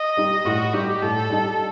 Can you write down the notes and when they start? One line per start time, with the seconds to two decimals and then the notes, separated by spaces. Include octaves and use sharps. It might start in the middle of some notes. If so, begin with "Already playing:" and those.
Already playing: D#5
0.17 G3 D#4
0.45 A2 F#4
0.73 G3 D#4 G4
1.02 A2 A4
1.30 G3 D#4